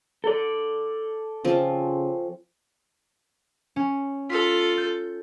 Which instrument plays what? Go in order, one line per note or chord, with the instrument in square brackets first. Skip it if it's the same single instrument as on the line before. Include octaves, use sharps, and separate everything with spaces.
[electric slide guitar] A4 D5
[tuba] C#3 [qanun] F3 C4 C#4
[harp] C#4
[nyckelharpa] F4 A4 [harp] B6
[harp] G6